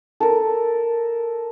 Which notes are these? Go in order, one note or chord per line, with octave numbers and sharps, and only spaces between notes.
A4 A#4